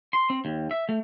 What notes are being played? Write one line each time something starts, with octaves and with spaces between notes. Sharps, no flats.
C6
C4
D#2
E5
A3